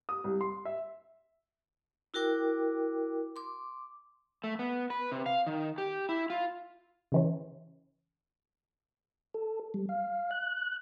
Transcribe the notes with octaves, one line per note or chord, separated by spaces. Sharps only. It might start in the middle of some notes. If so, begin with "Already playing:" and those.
D#6
C2
C6
E5
E4 F#4 A#4 G5 D6
C6 D6
A3
B3
B4
C3
F5
D#3
G4
E4
F4
C#3 E3 C#4
A4
G3
F5
F#6